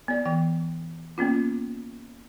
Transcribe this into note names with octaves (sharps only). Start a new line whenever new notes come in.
B3 D5
E3 G5
A#3 B3 C#4 F4